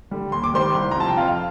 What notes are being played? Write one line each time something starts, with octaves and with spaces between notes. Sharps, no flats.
D3 G3
D#2 C6
D6
D#3 G3 C5 C6
C2
A#5
C3 F3 A5
G5
F2 F4 F5
F5